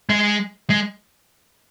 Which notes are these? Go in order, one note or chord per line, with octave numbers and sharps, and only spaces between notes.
G#3
G#3